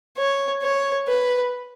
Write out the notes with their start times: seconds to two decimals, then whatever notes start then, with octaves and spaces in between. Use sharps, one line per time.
0.18 C#5
0.63 C#5
1.08 B4